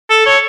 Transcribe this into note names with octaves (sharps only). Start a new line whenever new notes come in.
A4
C#5